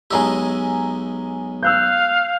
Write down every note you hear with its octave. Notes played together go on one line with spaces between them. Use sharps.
B1 G#3 G4 G#5 A#5 E6
F5 E6 F#6 G6